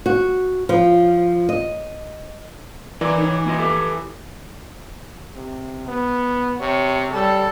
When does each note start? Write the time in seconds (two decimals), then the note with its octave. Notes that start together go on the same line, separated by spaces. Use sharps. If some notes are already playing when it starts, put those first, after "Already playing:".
0.06 F#4
0.69 F3
1.49 D#5
3.01 E3 A#4 D5
3.18 D#4 C#5
3.46 A#3 F4 D#5
3.59 G4 A4 E5
5.37 C3
5.88 B3
6.61 C3 C#5
7.13 G3 A4